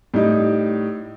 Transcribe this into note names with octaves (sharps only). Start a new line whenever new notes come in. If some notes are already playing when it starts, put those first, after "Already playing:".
A2 G3 D#4